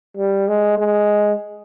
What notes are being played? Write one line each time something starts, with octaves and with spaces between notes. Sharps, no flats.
G3
G#3
G#3